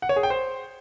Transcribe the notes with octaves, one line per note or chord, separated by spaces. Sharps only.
F#5
C#5
G#4
G5
C5